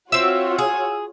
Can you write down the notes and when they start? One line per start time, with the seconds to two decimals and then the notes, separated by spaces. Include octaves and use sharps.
0.12 C4 F4 F#4 C#5 E5 E6
0.58 G#4